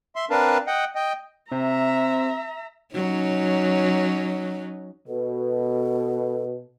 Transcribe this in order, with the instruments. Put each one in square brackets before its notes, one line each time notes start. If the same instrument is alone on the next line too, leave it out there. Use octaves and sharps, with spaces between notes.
[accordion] E5 C6
C4 D4 A#4 B4 F5 A5
D#5 F#5 G5
D#5 G5
[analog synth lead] C3 [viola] E5 A#5
[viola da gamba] F#3 C#4 D#4
[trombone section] B2 [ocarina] A4